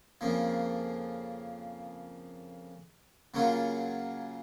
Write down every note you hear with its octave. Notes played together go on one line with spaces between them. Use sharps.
F2 C#3 F3 A#3
C#3 F#3 A#3 C#4 F4